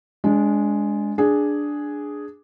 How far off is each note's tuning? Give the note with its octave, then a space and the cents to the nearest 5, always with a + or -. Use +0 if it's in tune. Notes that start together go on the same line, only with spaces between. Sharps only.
G#3 +0 D4 -25
D4 +0 G#4 +0